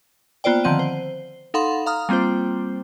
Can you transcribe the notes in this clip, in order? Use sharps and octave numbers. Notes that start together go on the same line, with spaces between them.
A#3 B3 F4 C5 D5 G5
D3 D#3 F3 C4 F#5 D#7
C5
D#4 A4 F5 F#5 B5 C6
F5 A#5 D#6 F6
G3 A#3 C4 F4 C5